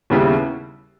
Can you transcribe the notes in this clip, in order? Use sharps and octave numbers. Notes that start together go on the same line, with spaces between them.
D#2 C#3 G3 B3 E4